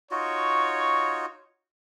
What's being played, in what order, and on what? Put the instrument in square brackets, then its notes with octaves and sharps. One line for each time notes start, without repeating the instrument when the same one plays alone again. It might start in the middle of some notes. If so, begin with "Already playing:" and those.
[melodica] D#4 F4 F#4 [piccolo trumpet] C#5